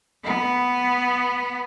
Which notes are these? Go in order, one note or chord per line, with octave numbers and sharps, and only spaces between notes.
B3